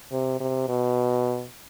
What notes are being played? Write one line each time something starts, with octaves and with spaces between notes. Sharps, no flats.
C3
C3
B2